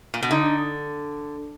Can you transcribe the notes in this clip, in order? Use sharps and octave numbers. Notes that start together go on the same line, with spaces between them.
A#2
B2
D3 D#4